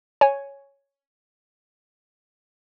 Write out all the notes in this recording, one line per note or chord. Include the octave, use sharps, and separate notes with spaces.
C#5 G#5